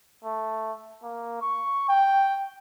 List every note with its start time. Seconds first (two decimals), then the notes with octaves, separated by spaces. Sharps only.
0.24 A3
1.03 A#3
1.42 C#6
1.89 G5